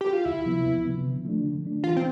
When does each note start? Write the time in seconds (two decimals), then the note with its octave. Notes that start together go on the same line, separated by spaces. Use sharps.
0.01 G4
0.13 F4
0.25 D2 E4
0.46 C3 F3 B3
0.65 D2
0.85 C3 F3 B3
1.04 D3
1.25 F3 A3 D4
1.44 D3
1.64 F3 A3 D4
1.83 E3 F4
1.96 C4